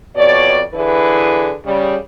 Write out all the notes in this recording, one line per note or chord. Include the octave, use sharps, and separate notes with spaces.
F2 B2 C#5 D5
D3 E3 E4 G#4 B4
C#3 G3